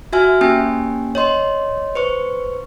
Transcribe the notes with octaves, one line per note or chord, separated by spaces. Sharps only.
F#4 E5 G#5 F6
A#3 C#4 G4 G5 G#5
C#5 D#5 C6
B4 C5 C#6